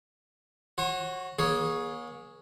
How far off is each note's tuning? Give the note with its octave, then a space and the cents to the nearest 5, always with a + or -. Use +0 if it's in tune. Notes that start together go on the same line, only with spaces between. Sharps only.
F#4 +0 C#5 -40
A#3 +45 G#4 +0 C#5 +0